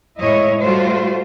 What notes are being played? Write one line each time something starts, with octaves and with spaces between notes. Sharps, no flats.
A2 G#3 E4 C#5 D#5
G3 A3 F4 F#4 C5